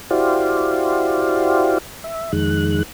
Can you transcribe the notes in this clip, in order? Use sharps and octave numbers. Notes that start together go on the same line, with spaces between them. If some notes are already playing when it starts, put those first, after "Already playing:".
E4 F#4 G4 C5 D5 F5
E5
F2 D#3 G#3 F#6